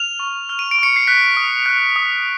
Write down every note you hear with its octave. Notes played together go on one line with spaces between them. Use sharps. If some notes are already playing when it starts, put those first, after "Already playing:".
Already playing: F6 F7
C#6
F6
D#7
D7
C#6 C#7
C7
F#6 B6
D#6
F#6
D#6